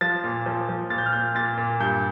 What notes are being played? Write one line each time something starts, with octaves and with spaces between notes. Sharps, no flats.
F3 A6
A#2
F3
F3
A#2 A6
G6
F6
A#2 G6
A#2 A6
A#2
G2 G6